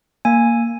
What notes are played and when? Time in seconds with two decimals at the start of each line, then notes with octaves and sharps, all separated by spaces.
0.25 A#3 G#5